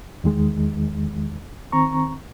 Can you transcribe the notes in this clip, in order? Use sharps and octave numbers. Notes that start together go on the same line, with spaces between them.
E2 D#3 G#3
D#3 C4 A#5 C#6